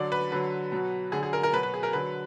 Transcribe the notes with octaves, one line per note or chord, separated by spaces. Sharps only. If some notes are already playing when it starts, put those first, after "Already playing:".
Already playing: D3 F#3 D5
B4
D3 F#3 B4
B2 F#3
D3 F#3 G#4
G#4
A#4
A#4
B2 F#3 B4
B4
G#4
A#4
D3 F#3 B4